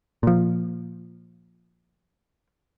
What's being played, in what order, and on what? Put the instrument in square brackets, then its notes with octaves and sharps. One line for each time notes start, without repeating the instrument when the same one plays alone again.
[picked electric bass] A#2 F3